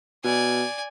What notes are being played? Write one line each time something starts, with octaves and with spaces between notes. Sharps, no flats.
B2 D5 G#5